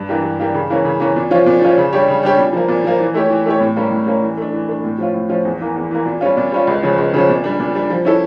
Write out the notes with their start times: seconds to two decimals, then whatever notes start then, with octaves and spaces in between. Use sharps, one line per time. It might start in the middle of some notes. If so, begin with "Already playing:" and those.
Already playing: G2
0.09 E3 A#3 D4 G4
0.23 G2
0.39 E3 A#3 D4 G4
0.54 C#3
0.70 E3 A#3 C#4
0.85 C#3
1.00 E3 A#3 C#4
1.16 A#2
1.31 F3 C#4 F4 C#5
1.46 A#2
1.62 F3 C#4 F4 C#5
1.78 C#3
1.93 G3 D4 G4 C#5
2.08 C#3
2.23 G3 D4 G4 C#5
2.38 A#2
2.53 F3 A#3
2.68 A#2
2.84 F3 A#3
3.00 E3
3.14 A3 E4 G4 C#5
3.30 E3
3.46 A3 E4 G4 C#5
3.60 A2
3.76 G3 A#3 C#4
3.91 A2
4.06 G3 A#3 C#4
4.22 E3
4.37 A3 D4
4.53 E3
4.69 A3 D4
4.84 A2
4.98 F3 C#4 F4
5.14 A2
5.29 F3 C#4 F4
5.45 E2
5.61 E3 A#3
5.76 E2
5.91 E3 A#3
6.06 A#2
6.21 G3 C#4 F4
6.37 A#2
6.52 G3 C#4 F4
6.67 C#2
6.83 C#3 F3 C#4
6.98 C#2
7.14 C#3 F3 C#4
7.29 A#2
7.44 G3 D4
7.60 A#2
7.75 G3 D4
7.90 F3
8.05 C#4 E4 A4